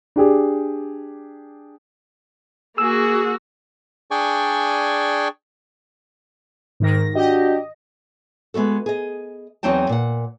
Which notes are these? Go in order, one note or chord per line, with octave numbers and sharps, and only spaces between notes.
D4 G4 G#4
A#3 F#4 G#4 E6
D4 G#4 D5 G5 G#5 C#6
G#2 D#3 A#6
D4 F#4 G4 D#5
G#3 B3 F#4 A4
G#4 D#5
E2 F#3 C4 D#4 G5 A5
A#2 F#5